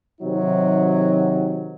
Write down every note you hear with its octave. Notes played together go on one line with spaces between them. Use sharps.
C3 D#3 F#3 D#4